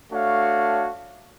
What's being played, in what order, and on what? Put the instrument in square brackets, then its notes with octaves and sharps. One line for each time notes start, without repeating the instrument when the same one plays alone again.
[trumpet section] A3 D4 F#4 C#5 F5